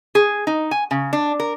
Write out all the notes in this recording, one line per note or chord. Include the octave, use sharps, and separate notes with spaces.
G#4
D#4
G#5
C#3
D4
A#4